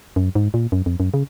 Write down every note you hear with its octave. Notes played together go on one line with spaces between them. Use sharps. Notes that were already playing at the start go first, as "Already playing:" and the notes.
F#2
G#2
A#2
F#2
F2
F#2
C#3